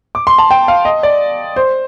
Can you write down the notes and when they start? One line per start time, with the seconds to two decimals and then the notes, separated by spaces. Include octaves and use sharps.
0.15 D6
0.27 C6
0.38 A5
0.51 G5
0.68 F5
0.85 D#5
1.03 D5
1.56 C5